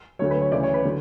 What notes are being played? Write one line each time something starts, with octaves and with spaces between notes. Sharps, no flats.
D2 D3 F#3 C#5
B4
C#5
D2 C#3 E3 D5
C#5
B4
D3 F#3